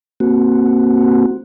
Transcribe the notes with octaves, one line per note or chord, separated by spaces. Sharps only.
A#3 C4 F#4